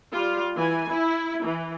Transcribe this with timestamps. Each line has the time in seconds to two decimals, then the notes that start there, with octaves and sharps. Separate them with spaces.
0.10 G3 F4
0.55 E3 G#5
0.89 E4
1.44 E3